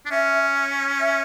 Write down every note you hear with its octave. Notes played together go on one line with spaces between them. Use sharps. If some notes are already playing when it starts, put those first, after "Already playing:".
D4
C#4 E5
E5